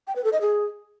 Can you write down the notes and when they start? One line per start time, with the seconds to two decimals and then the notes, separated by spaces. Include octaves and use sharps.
0.07 G5
0.16 B4
0.24 A4
0.33 D#5
0.41 G#4